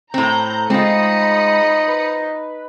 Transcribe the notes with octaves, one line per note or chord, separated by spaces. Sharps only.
A2 C4 A#5 G6
G#3 C4 D#4 F4 B5 D#6 C#7
B4